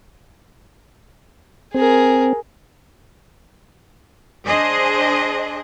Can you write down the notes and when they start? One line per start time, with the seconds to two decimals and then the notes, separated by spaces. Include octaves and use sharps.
1.74 C4 G#4 A#4
4.45 D4 G#4 C5 D#5